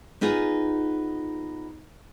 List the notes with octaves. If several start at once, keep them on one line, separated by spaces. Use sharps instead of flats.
B3 D#4 F4 G#4